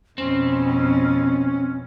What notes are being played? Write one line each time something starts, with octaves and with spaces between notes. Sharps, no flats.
F2 B2 C4 C#4